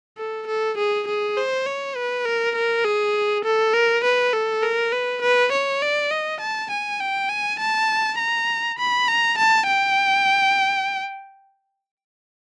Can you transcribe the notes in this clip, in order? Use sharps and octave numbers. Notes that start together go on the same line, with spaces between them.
A4
A4
G#4
G#4
C5
C#5
B4
A#4
A#4
G#4
A4
A#4
B4
A4
A#4
B4
B4
C#5
D5
D#5
A5
G#5
G5
G#5
A5
A#5
B5
A#5
A5
G5